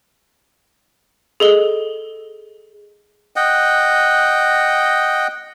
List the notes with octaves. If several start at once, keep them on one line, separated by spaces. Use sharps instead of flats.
G#4 A4 D#5 G7
D#5 F#5 G5